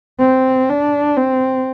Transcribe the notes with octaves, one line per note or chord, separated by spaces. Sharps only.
C4
D4
C4